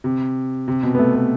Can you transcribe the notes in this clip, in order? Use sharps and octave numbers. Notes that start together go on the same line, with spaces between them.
C3
C3
B2
B3
A3
B3